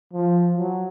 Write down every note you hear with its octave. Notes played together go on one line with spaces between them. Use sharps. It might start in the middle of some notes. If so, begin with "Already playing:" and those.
F3
F#3